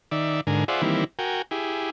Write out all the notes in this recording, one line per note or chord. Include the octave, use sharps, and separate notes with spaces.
D#3 D5 E5
G#2 D3 A#4 G#5
F4 G#4 C5 D5 E5 F#5
D#3 E3 G3 A#3 C4 E4
F#4 A#4 G5 G#5
E4 G4 G#4